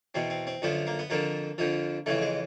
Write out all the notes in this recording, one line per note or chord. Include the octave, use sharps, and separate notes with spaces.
E2 B2 C4
C4
C4
F#2 D3 F3 B3
A#3
B3
F2 D3 F3 A#3
F2 D3 F3
F2 C#3 E3 A3
G#3